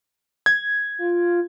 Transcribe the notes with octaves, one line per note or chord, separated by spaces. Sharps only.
G#6
F4